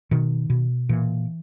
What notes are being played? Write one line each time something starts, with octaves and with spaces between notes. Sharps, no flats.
B2 D#3
B2
A#2 E3